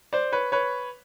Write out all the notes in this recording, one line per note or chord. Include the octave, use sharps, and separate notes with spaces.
C5 D5
B4 C#5
B4 C#5